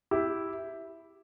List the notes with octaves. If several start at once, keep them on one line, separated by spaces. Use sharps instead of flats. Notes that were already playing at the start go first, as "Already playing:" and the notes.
E4 G4